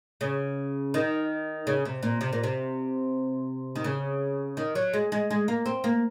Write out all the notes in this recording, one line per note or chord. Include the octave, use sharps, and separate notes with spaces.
C#3
D#3
C#3
C3
A#2
C3
A#2
C3
D#3
C#3
D#3
F#3
G#3
G#3
G#3
A#3
C4
A#3